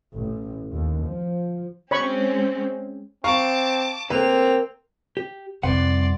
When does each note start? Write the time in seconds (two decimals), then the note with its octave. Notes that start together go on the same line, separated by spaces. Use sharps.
0.16 A1
0.71 D#2
1.06 F3
1.91 G#3 C4 C#4 C#5 B5 C#6
3.24 C4 F5 A5 A#5 C#6 D6
4.10 A#3 C4 B4 F7
5.17 G4
5.63 C2 F2 C3 G3 B4 D5 F#5 C6